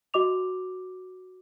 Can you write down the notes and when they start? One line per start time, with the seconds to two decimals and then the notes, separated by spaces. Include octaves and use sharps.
0.14 F#4 D#5 D6 F7